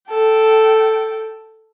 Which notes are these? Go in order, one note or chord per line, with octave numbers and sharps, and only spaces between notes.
A4 G5